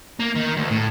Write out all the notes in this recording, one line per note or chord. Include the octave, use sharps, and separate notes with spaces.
A#3
D#3
D2
A2